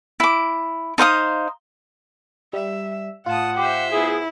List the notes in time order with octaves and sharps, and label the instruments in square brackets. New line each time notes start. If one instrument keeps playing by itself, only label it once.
[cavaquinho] E4 D6
D#4 C5 F5 D#6
[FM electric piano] G3 [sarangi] E5
[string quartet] A2 A5 D#6 [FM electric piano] F4 [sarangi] F#5
[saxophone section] G4 [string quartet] C5 E5
[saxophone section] B3 G#4 [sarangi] E4